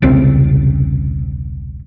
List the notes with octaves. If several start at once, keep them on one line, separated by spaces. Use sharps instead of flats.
E1 C2 C#3 C4